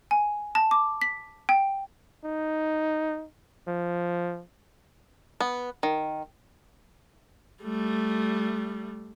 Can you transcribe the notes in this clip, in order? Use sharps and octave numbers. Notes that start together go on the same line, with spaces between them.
G#5
A5
D6
B6
G5
D#4
F3
B3
D#3
G3 A3